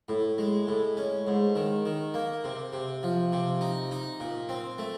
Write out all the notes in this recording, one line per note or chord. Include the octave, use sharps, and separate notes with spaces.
A2
G#3
A2
C#4
G#2
D#3
D#3
A#3
C3
C3
F3
C3
D#4
D#4
A#2
C4
A3